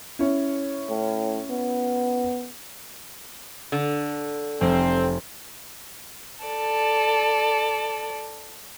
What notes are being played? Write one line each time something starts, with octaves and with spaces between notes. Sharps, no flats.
C#4 E4 C#5
A2
B3
D3
F1 C4
A4 D5